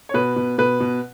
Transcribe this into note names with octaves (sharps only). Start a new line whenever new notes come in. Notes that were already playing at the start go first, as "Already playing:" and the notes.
C#5
B2 B4
B2
B2 B4
B2